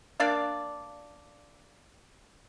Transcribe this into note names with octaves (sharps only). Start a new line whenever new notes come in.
A#3 D4 D5 F5